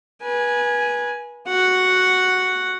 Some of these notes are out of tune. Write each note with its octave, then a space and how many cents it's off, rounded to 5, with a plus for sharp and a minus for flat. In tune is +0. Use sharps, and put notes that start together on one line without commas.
B4 -30 G#5 +0
F#4 +0 F#5 +0